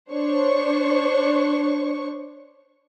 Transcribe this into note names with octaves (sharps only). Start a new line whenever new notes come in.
D4 C5 C#5 C#6